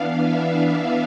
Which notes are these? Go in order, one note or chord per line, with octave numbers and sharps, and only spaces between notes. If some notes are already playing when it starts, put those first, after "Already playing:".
Already playing: E3 B3 D4 F5
E5